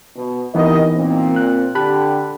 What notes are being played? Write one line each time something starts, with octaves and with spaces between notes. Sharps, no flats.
B2
C3 E3 B3 D#4 A#4 D#5
A#2 C4
F#6
D3 G4 A5 B5 F#6